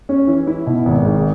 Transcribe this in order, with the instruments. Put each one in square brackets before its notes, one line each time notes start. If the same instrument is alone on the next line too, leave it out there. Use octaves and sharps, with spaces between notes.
[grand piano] C#4
E3
E4
B2
G#1
G#2